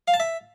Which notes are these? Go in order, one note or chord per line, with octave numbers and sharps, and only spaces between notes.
F5
A5
E5